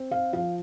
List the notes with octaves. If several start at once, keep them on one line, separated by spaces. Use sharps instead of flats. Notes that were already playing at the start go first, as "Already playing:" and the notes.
Already playing: C4
F5
F3 F5